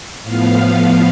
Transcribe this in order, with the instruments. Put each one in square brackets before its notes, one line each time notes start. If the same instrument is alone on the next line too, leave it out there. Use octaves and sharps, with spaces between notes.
[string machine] A2 F3 B3 F5